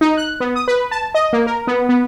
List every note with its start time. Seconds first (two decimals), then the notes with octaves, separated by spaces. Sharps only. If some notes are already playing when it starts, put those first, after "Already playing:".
0.01 D#4
0.17 F#6
0.40 B3
0.56 D#6
0.68 B4
0.91 A5
1.15 D#5
1.33 A#3
1.47 A#4
1.67 B3
1.89 B3